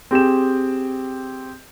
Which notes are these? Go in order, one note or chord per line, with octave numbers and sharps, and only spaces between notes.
C4 G4 G#4 E7